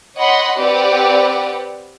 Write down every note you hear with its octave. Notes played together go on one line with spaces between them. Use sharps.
C#5 D#5 F#5 B5 C6
C4 G4 B4 D5 F#5